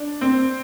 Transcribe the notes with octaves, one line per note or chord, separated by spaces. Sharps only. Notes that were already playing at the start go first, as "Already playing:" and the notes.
Already playing: D4
C4